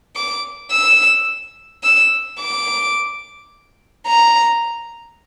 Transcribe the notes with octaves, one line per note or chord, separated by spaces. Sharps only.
D6
E6
E6
D6
A#5